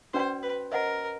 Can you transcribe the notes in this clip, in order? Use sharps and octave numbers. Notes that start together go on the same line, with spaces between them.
C#4 F#4 B4 C5 D5 G5
B4
A#4 C5 D#5 F#5